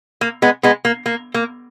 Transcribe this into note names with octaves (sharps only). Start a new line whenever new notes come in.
A#3
G#3 B3
G#3 B3
A#3
A#3
A#3